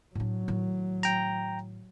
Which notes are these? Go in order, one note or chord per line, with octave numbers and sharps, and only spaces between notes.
A2 F#3 D4
A2 D#3
G5 A#5